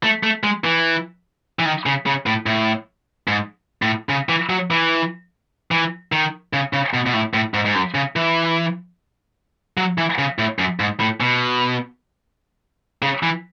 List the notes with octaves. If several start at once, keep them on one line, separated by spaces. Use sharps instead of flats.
A3
A3
G#3
E3
E3
D#3
C#3
C#3
A2
A2
G#2
A2
C#3
E3
F#3
E3
E3
D#3
C#3
C#3
B2
B2
A2
A2
G#2
G#2
F#2
C#3
E3
F#3
E3
C#3
A2
F#2
G#2
A2
B2
C#3
E3